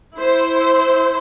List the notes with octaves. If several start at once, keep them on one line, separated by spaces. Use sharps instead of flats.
E4 C5